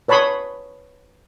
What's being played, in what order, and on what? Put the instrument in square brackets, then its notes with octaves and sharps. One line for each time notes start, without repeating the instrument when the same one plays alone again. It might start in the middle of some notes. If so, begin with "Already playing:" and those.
[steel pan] B4 C#5 A5 B5 C6 D#6